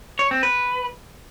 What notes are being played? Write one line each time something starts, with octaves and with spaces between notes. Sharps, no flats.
C#5
C4
B4